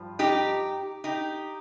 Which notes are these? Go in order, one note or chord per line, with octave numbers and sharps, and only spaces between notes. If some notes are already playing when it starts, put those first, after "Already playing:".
Already playing: G2 F3
D#4 G4
D#4 G4